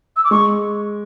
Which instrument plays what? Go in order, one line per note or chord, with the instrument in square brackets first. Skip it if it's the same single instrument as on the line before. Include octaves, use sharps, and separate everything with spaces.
[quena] E6
D6
[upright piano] G#3 [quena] C#6